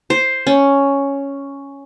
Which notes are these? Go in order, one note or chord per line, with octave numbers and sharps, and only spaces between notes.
C5
C#4